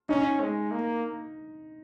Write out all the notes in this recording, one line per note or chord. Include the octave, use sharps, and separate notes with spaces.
C#4 D#4
G#3
A#3